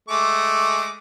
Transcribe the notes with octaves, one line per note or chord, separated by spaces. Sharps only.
G#3 A3 D6